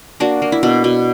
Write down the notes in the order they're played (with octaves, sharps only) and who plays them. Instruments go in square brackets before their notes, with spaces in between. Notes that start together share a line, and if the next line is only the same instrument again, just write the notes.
[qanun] A#3 D4 F#4
A#3
E4
B2 D4
B2